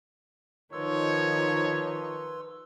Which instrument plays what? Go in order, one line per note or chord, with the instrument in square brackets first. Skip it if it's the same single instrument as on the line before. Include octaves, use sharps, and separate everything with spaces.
[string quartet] D#3 F3 D#4 [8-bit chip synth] B4 C6 E6 [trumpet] C#5